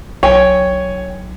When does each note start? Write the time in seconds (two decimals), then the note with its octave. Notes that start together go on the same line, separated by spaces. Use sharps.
0.23 B1 C#5 G5 G#5